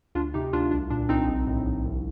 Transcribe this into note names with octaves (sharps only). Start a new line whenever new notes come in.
D2 D4 F4
C3 D#4 G4
D2 D4 F4
C2 D4
A#2 D4
C2 C4 D#4
A#1
A2
A#1
C2